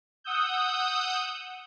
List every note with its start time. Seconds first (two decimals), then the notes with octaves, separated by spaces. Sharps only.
0.24 F#5 D#6 E6 G6